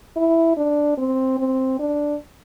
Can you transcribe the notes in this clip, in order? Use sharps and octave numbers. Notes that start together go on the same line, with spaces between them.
E4
D4
C4
C4
D4